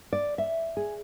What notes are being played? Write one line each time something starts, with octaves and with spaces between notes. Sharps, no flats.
D5
E5
G#4